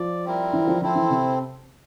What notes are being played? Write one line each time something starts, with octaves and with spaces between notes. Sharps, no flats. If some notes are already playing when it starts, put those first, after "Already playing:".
Already playing: F3 D5
G3 C4 E4 A#4
E3
F3
F3 C4 E4 A4 C5
E3
C3